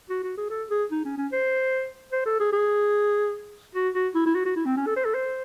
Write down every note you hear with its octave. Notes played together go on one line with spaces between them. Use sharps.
F#4
F#4
G#4
A4
G#4
D#4
C#4
C#4
C5
C5
A4
G#4
G#4
F#4
F#4
E4
E4
F#4
F#4
E4
C4
C#4
A4
C5
A4
C5